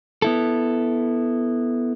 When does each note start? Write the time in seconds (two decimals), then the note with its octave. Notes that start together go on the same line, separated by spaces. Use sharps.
0.22 B3 E4 A4